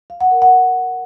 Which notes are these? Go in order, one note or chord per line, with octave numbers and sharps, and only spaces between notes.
F5
F#5
A#4
F#5